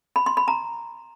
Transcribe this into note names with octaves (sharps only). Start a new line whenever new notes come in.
B5
C6
B5
A#5